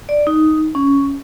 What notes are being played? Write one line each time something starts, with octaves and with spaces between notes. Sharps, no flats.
D5
D#4
C#4